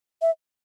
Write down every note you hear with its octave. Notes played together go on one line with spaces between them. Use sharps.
E5